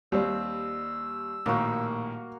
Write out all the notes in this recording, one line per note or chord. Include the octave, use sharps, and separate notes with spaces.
D#2 G3 C4 E6
A#1 A2 D#3 A#3 F#4